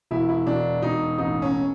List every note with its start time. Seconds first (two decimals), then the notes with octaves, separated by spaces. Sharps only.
0.11 E1 E4
0.29 E4
0.47 E1 D4
0.82 E1 D#4
1.18 A1 D#4
1.42 C#4